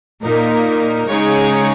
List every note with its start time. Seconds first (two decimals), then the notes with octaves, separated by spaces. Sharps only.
0.22 A#2 A#3 D#4 A#4
1.08 C#3 G#3 D#4 G#4 C#5